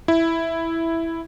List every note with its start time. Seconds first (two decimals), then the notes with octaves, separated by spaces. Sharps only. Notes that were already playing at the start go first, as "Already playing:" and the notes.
0.08 E4